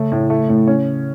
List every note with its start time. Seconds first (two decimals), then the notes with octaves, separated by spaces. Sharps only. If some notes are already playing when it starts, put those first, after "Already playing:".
Already playing: C#3 A3
0.12 A2
0.30 A3
0.49 A2
0.67 C#4